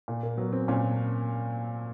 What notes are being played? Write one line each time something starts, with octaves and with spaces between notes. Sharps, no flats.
A#2
A#3
F#3 B3
C4
A#2 C#4